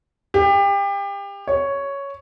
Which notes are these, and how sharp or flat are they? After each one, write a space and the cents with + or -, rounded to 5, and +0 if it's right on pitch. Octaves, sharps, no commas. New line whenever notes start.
G4 +30
C#5 +5